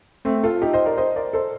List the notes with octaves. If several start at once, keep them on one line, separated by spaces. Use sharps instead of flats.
A3 C4
F4 A4
D#4 G4
C5 D#5
A#4 D5
C5 D#5
A#4 D5
A4 C5